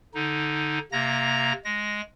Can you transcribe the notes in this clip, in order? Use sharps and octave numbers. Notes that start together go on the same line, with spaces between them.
D3 D#4
C3 A#3 A#5 A#6
G#3 A#6